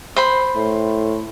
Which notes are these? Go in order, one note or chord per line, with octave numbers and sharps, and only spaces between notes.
C5 B5 C6
A2